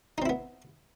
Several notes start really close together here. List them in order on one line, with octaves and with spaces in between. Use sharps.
D#4 C4 E4 B3